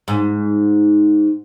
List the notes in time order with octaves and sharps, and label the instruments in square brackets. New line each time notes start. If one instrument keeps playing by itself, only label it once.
[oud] G#2